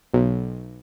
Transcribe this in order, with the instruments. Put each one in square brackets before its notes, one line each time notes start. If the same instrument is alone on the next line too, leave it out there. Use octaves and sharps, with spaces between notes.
[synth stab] B1